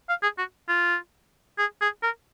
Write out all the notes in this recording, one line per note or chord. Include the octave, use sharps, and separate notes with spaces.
F5
G#4
F#4
F4
G#4
G#4
A#4